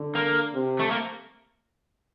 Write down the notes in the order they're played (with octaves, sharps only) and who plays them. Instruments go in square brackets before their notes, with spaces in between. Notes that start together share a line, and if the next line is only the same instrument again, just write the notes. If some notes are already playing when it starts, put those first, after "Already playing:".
Already playing: [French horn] D3
[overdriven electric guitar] A#3
[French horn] C3
[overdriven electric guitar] A3
A#3